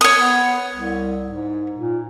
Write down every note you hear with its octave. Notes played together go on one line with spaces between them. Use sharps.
C#5 D#6
B3
C2
G#2
A#2